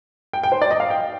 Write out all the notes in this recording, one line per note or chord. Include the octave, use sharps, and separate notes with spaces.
G5
G5
C5
D5
D#5
F5
G5